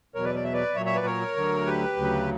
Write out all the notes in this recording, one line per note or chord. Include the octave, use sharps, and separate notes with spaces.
E2 B2 F#3 A#4 C#5
B4 D5
D5
E5
B4 D5
A#2 F#3 C#5 E5
C#5 E5
B4 D5
A#4 C#5
D2 D3 F#3
G4 B4
D2 C#3 F#3